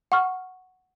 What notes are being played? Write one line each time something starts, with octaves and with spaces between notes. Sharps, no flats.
F#5 C#6 F6